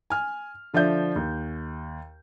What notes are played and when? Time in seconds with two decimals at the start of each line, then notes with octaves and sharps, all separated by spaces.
0.10 G#5 F6
0.74 D3 F3 D4 E5 G6
1.16 D#2